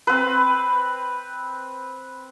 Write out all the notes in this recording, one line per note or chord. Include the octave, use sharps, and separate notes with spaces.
C4 B4